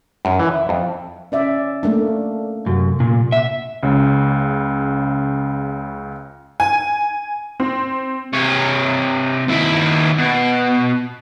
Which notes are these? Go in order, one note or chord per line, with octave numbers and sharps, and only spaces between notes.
F#2
E3
E5
F2
C#4 D5 E5
A3 A#3 D4
F#2 C3
A#2
A#2 E5 F#5
C#2 C#3
G#5
C4
C3 C#5
D#2 E4
B2